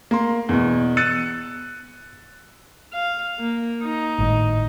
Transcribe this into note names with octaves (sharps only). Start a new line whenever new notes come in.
A#3 C6
E2 B2
E6 F#6 A6 C#7 D#7
F5
A#3
D#4
G#1 A2 D#5